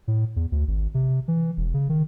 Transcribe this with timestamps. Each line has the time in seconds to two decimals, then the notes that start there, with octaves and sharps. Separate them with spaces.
0.08 A2
0.36 E2
0.52 D2
0.68 G#1
0.94 C3
1.28 E3
1.57 E1
1.74 C#3
1.89 D#3